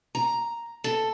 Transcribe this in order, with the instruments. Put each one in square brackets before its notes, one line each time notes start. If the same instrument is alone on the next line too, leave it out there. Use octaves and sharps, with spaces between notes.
[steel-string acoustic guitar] A#5
A4